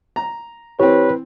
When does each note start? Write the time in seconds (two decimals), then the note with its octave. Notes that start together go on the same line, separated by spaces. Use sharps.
0.16 A#5
0.79 E3 C4 G4 B4 C#5